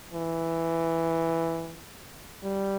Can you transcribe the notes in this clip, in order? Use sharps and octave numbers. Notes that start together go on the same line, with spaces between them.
E3
G3